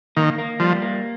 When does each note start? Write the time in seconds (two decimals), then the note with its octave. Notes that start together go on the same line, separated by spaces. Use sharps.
0.17 D#3 A#3
0.38 A#3
0.60 F3 G3
0.82 A#3